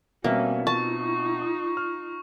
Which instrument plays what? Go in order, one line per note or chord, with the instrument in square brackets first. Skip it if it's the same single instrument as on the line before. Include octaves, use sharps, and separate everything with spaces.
[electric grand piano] B2 C4 E5 [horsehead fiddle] G3 C#4 [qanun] A#3
[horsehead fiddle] D#4 F4 [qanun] A5 [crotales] C#6
[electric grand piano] D#6
F6